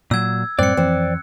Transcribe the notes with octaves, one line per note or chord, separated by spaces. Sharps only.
A#2 F#3 E6 G#6
F#2 A2 G3 C4 D5 F#6 C#7
F2 E3 F3 C4